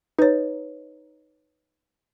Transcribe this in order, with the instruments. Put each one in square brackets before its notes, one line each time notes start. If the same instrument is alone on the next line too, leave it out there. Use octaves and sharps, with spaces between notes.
[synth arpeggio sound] D#4 [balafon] B4 C#5